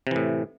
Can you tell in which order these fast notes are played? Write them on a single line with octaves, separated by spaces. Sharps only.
C3 E3 A2